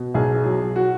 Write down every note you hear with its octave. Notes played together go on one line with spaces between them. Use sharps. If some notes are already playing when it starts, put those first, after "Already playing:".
Already playing: B2
B1 G#4
F#3
F#4